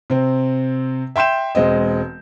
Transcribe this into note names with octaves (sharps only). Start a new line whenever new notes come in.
C3 C4
E5 G5 C6 G6 E7
E1 G#3 C4 D#5